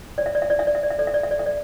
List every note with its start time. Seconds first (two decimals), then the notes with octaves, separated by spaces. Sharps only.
0.18 C#5 D5
0.26 E5
0.35 D5
0.42 E5
0.50 D5
0.59 D4 E5
0.67 D5
0.75 E5
0.83 D5
0.90 E5
0.98 A4 D5
1.07 E5
1.14 D5
1.23 E5
1.31 D5
1.38 A4 E5
1.46 D5